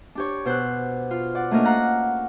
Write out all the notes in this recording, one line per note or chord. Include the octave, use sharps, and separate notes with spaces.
D4 G4 C#5
B2 C5 E6 F#6
F4
D5 F#5
A3 A#3 C#4 D4 A#4 D#5
F5 F#5 A#5 F#6